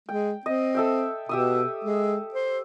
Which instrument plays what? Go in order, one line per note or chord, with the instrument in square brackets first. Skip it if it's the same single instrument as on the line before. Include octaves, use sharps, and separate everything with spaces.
[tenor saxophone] G#3 [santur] G5
[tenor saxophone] C4 [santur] D#5
[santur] A4 E5 G5
[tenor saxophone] B2 [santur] G4 E5 D#6
[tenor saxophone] G#3
C5